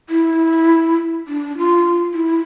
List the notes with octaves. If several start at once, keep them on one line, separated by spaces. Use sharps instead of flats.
E4
D4
F4
E4